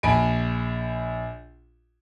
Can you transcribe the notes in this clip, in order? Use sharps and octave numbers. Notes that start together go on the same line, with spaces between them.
A#1 G#5 A5 B5 D7